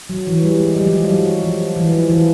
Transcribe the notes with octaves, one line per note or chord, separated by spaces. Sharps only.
F#3
E3
G3
G#3
G3
F3
F#3
G3
F#3
F3
E3
F3
E3